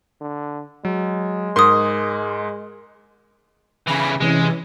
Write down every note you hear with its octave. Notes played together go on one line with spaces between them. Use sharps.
D3
F#3 G#3
G#2 A#4 C6 D#6
C#3 E3 B5 A#6
C3 E3 G#3 C#4